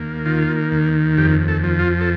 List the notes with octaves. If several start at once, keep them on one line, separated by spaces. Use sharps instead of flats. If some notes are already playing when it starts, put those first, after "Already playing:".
Already playing: D#2 A#3
D#3 F4
D#2
F2 G4
A4
F3
F4
A4